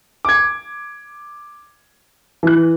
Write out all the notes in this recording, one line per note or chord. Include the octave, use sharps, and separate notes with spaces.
D6 G#6
E3 F#6